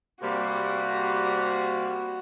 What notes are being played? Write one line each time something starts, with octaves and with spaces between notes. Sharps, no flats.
C3 G3 A#3 F#4